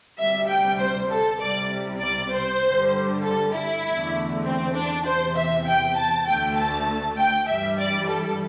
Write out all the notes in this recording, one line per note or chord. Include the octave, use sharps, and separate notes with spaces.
D2 C3 G3 E5
G5
C5
A4
C2 C3 G3 D5
D5
C5
G2 D3 G3
A4
E4
E2 D3 A3
C4
D4
E2 C3 E3 C5
E5
G5
A5
D2 D3 A3 G5
A5
G5
G2 E3 G3 E5
D5
A4